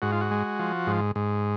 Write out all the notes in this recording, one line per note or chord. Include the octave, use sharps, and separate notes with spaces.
G#2 F#4
F4
F#4
G#3
F3
G#2
G#2